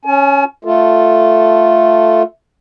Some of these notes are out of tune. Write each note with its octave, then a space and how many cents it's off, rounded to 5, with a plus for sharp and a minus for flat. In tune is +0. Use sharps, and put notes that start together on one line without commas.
C#4 +0 G#5 +40
A3 +0 F4 +0 A4 +0